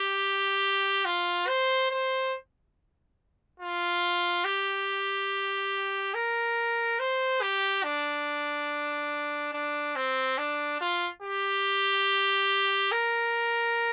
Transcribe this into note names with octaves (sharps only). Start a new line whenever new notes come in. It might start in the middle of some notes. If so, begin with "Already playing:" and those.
Already playing: G4
F4
C5
C5
F4
G4
A#4
C5
G4
D4
D4
C4
D4
F4
G4
A#4